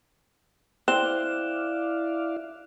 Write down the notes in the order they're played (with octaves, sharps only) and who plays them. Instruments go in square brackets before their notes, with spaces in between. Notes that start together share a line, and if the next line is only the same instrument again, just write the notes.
[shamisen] C4 [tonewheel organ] E4 D5 F5 [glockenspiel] F#6 E7 G7